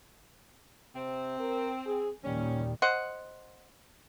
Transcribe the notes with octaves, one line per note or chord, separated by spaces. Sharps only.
C3 C4
A#4
G#4
D#2 A#2 D#3 G3 C#4
C5 D#5 F#5